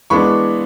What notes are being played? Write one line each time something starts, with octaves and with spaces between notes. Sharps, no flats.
E3 G#3 B3 D4 B5 C#6